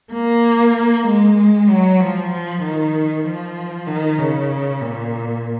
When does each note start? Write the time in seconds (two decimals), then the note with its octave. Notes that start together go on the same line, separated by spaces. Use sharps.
0.13 A#3
1.07 G#3
1.69 F#3
2.00 F3
2.31 F3
2.63 D#3
3.25 F3
3.87 D#3
4.19 C#3
4.81 A#2